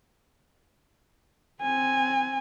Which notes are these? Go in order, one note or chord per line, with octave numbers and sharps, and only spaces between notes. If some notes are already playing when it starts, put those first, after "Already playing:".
C4 G#5